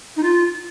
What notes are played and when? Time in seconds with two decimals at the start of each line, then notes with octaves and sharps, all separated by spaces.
0.17 D#4
0.23 F4